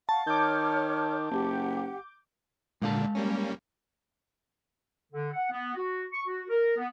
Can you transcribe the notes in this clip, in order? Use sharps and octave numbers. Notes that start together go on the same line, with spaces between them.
F5 F#5 A5 C#6
D#3 C#5 D6 F6 G6
F#1 G4 F#5
A#2 D3 G#3 F5 A5
G3 A#3 C#4
D3
F#5
B3
F#4
C#6
F#4
A#4
B3